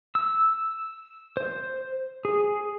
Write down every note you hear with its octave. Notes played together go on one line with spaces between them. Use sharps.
E6
C5
G#4